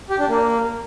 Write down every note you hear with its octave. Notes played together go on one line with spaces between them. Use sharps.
G4
D4
A#3